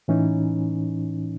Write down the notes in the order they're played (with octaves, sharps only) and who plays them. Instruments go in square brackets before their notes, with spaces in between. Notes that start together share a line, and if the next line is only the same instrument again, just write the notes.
[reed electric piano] A2 E3 C#4 D#4